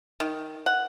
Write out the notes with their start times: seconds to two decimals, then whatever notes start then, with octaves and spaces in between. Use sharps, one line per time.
0.20 D#3
0.66 F#5